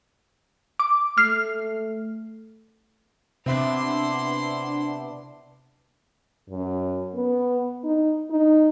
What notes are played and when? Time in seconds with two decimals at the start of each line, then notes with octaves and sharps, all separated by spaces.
0.79 D6
1.18 A3 F6 C7
3.46 C3 B3 C4 D4 E4 E5 C6 D6
6.50 F#2
7.15 B3
7.84 D#4
8.30 D#4